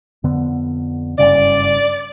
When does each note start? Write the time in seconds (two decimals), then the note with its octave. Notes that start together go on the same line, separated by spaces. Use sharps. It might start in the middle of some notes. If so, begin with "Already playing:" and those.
0.24 F2 D3 B3
1.19 F#1 G2 C#3 D5